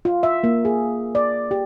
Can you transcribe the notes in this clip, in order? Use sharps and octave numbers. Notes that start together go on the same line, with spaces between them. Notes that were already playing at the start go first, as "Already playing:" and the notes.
F4
E5
A#3
G#4
D5
G4